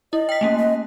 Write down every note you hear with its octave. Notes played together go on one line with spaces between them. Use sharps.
E4 D#5
G5 B6
A3 A#3 C#4
D#5